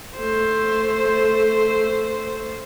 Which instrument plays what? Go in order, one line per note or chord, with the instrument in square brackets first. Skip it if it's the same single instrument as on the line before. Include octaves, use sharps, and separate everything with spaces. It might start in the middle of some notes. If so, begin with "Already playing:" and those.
[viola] A3 C5